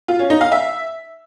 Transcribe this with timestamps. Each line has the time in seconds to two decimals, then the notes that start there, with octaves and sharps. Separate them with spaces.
0.08 F4
0.19 C#4
0.30 D#4
0.41 F5
0.52 E5